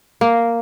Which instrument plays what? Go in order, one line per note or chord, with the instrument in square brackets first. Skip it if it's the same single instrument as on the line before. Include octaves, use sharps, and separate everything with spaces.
[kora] A#3